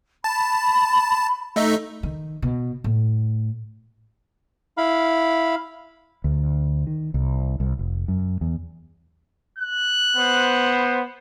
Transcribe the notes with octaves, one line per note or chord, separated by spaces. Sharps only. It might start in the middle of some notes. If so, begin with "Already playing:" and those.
A5 B5
A3 D#4 E5
D#3
B2
A2
E4 F5 B5
D2
D#3
C2
C2
F1
F#2
E2
F#6
B3 C5